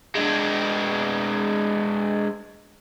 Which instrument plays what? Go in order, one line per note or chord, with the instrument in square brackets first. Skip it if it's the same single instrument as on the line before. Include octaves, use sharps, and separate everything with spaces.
[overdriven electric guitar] G#3 D4